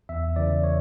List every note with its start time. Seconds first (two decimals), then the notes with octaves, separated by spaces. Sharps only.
0.09 E2 E5
0.36 C#3 E3 D5
0.64 C#5